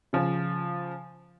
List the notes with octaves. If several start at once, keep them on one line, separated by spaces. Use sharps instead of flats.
C#3 F3